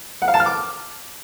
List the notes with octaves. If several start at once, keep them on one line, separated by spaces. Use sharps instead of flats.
F#5
F5
A5
F6
D6